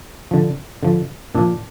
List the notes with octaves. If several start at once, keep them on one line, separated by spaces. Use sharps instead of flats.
D3 F3
D3 F3
A#2 F3 D4